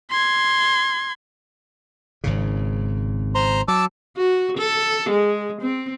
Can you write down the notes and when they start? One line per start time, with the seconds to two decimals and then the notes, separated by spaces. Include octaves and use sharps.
0.10 C6 G#6
2.24 G#1 G#2 C#3
3.35 C5 A#5 C6
3.68 F#3 A5 D6 E6
4.17 F#4
4.58 A4
5.10 G#3
5.62 C4